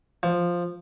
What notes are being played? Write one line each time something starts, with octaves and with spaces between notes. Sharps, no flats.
F3